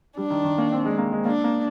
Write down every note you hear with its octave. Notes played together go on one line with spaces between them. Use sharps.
G3 D4
D#3
D#3
A#3
C4
G#3
A#3
G#3
A#3 D4
A#3